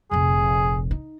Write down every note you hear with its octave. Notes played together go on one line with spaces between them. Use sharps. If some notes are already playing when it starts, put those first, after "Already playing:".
F1 A#1 G#4
D#4